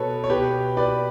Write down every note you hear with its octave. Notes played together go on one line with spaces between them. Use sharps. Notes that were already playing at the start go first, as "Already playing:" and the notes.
Already playing: B2 A4 B4 C#5
C#5
B2 G4 B4
B4 D5